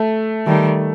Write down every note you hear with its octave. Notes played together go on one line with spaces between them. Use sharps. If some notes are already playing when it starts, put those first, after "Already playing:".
Already playing: A3
D#3 G3 A3